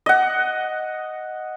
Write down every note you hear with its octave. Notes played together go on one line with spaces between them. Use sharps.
D#5 F#5